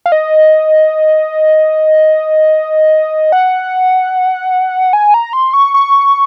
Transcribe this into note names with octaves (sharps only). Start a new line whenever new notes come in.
F5
D#5
F#5
G#5
A#5
C6
C#6
C#6